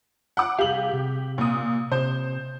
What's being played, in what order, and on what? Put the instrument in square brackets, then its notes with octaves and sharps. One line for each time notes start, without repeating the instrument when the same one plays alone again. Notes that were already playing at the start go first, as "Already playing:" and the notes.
[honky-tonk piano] F#5 D6
[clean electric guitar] C2 G#4 F5 [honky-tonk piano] G4 F#7
[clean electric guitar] C3
[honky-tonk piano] A#2 D#6
[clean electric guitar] C3 [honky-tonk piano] C5